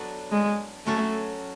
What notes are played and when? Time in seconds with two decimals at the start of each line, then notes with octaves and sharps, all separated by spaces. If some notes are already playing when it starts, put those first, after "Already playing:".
Already playing: F#3 B3 D4 F#4 A4
0.32 G#3
0.86 F#3 A3 C#4 F#4 A4